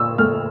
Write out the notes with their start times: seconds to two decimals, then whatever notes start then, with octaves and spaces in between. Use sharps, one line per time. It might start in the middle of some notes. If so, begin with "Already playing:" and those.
Already playing: A#2 E6
0.18 A3 F6